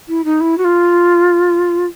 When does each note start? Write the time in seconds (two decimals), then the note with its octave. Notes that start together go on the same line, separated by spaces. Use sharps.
0.08 E4
0.24 D#4
0.40 E4
0.58 F#4
0.64 F4